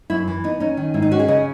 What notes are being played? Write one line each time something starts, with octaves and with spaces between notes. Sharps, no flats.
F#2 E4
E3
B3 D#4
C#4 D#4
D#3
G#2 E4
D#4
C#4 F#4
G#4
C#3 D#5